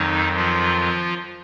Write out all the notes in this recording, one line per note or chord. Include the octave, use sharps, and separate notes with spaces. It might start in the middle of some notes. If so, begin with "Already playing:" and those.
Already playing: F2 D#3 F#3 D#4
F3 F4